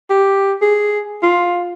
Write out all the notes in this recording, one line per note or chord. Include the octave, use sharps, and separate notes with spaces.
G4
G#4
F4